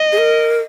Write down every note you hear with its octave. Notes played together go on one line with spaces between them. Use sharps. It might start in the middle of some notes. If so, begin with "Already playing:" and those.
Already playing: D#5
G#4
A#4